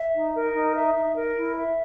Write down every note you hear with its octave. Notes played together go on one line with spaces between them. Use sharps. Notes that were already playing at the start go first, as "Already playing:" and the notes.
Already playing: E5
D#4
A#4
D#4
E5
D#4
A#4
E4
E5